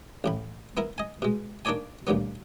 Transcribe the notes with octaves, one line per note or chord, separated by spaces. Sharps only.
A1 A2 B5
B3 E4 A#4
D#5 G#5
B2 G#3
A#3 D4 D#4 C#5 D5 G#5
D2 G2 A#2 F#3 B3